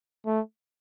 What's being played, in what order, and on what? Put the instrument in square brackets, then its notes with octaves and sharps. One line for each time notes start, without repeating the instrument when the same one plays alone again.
[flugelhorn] A3